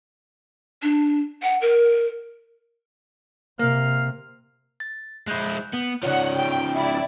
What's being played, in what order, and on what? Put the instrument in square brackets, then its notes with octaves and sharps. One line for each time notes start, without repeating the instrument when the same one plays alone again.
[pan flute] D4
F#5
A#4
[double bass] C3 [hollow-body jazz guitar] A#3 [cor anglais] F5
[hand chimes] A6
[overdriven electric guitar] G#3 E4 [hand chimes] F#6 G6
[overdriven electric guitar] B3
[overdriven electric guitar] C#3 F3 [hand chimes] C#5 D5 [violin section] F#5
[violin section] G5
[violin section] E4 D5 [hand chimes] G5